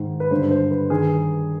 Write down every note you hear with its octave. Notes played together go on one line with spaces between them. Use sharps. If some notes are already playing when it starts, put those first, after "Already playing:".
Already playing: G#2 D#3
B4
G2 D3 C5
C5
B4
G2 D#3 G#4